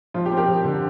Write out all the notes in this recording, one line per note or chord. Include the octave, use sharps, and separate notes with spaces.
F3 F4
G4
C4
G4 A#4
F3
D3